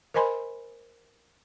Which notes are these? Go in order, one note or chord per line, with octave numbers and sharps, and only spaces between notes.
A#4 C5 D#5 G#5 B5 C6